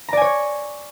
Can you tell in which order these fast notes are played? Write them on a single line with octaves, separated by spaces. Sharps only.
A#5 D5 G#5 C#5